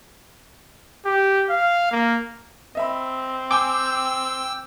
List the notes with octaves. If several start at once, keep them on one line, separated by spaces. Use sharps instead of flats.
G4
F5
A#3
C4 D#5 E5 B5
G5 G#5 D6 E6 G6 G7